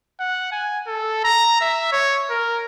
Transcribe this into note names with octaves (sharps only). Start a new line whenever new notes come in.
F#5
G#5
A4
A#5
E5
C#5
A#4